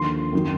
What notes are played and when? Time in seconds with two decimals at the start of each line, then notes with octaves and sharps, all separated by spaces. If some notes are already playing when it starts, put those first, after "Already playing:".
Already playing: D#2 D3 F3 C6
0.33 F#2 D#3